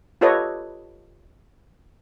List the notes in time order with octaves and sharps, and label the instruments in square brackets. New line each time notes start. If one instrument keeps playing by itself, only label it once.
[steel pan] F4 G4 A4 B4 C#5 D#5